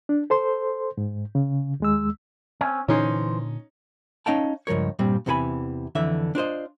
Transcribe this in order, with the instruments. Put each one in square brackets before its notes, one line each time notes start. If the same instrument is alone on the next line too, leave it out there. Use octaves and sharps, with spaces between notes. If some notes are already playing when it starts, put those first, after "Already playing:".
[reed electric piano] D4
A4 C5 C6
G#2
C#3
D#2 G#3 E6
[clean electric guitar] C4 C#4
[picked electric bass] A#2 D3 [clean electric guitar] E3 C5 [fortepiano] C#4 D#4
[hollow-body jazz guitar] C#4 D#4 F5 G5 A5
C#2 G2 F3 A#4 C#5
G2 A#2 G3 C4
E2 C3 E3 A4 G#5 B5
F2 D3 E3 E5
D4 F4 C5 D#5